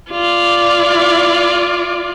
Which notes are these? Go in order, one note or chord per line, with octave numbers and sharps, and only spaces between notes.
F4 D5